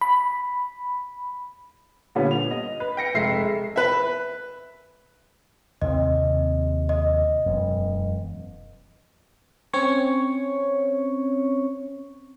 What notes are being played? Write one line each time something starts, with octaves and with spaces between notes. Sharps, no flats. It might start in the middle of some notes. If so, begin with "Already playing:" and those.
B5
A#2 D3 G3 B3 C#4
F7
D#5
B4
G5 A#6 C#7
F1 G#3 E5 C7
B4 E5
D#2 C3 C4 D#5
D#5
E1 F#2
C4 C#4 C#5 C#6